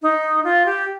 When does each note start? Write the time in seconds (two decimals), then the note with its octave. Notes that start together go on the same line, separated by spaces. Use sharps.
0.02 D#4
0.44 F4
0.66 G4